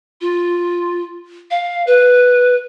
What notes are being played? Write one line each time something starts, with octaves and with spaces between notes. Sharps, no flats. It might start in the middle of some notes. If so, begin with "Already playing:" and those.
F4
F5
B4